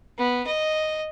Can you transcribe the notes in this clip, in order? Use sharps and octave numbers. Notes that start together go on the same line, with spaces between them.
B3
D#5